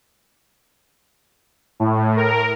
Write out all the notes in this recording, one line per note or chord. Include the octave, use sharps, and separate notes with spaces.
A2
A#4